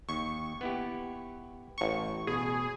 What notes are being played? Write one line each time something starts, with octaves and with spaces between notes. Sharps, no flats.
D#2 C#6
B3 E4 G4
A1 C#6
B2 G#4